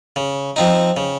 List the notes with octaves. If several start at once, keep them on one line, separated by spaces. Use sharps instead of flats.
C#3
F3 C4 D#4
C#3